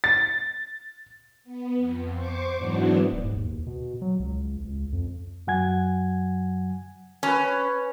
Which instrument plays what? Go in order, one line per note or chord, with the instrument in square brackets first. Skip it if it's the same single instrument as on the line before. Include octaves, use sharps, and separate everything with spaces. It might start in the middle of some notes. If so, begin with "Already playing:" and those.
[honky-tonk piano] A6
[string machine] B3
F2
C5 C#6 D6
G#2 E3 F#3 B3 D4
[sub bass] D1
G#2
D#2
B2
F#3
C#2
C#2
F2
[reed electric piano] F#2 F#3 F#5 G#5 G#6
[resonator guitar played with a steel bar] C#4 [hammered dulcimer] B4 C#5